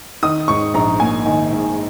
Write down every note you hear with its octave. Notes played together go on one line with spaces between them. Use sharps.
D#3 D#6
G#2 C#6
A#1 A#5
A#3 G#5
D#3
G#2